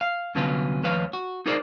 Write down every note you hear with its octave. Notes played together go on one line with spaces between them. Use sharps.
F5
C2 D3 F#3 B3 C#4 F4
D#2 F3 A3 B4 C#5 F5
F#4
D#4 F4 G#4 A#4 C5 D5